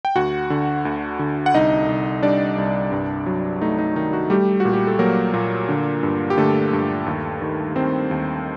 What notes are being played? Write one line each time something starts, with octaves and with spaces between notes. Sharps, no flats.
G5
D2 F#4 F#5
D3
D2
D3
F#5
C2 D#4 D#5
C2
G3 D4 D5
C2
G2
F#3
A3 D#4
D#4
D#3 D#4
F#4
G3 A3 G4
A#2 F#4
G4
A4
F#3 A#3 A#4
A#2
D3
G2
G4
D3 A3 A4
G2
D#2
D#3
D#3 C4 C5
D#2